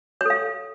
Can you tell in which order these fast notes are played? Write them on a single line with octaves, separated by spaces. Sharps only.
C#5 A4 F5